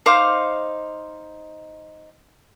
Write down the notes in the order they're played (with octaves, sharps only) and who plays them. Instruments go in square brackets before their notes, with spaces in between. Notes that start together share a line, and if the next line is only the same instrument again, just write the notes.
[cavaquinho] D#4 C5 F5 D6